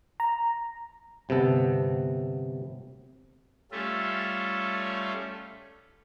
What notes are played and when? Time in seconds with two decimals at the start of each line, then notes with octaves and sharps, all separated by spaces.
0.20 A#5
1.29 G1 C3 B3 A4 F#5
3.72 G3 A3 C#4 F4 A4 E5